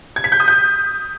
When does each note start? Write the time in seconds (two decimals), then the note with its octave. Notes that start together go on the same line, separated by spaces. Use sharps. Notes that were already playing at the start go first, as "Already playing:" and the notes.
0.16 G#6
0.24 B6
0.32 G6
0.40 D#6
0.48 G6